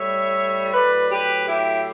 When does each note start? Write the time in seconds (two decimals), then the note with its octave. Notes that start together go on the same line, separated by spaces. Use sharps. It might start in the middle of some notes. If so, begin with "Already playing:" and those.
Already playing: A2 G3 C#5 E5
0.73 A2 F#3 B4 D5
1.10 G4 B4
1.47 E4 G4